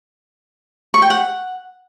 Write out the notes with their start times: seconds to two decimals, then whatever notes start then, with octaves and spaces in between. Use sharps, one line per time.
0.94 C#6
1.02 G5
1.10 F#5